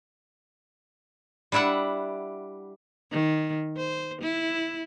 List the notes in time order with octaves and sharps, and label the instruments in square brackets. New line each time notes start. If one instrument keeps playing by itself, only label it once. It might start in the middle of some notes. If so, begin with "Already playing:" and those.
[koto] G3 D4 E4 E5 F#5
[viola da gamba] D#3
C5
E4